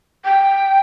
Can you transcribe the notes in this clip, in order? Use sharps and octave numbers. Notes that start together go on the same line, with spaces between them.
G5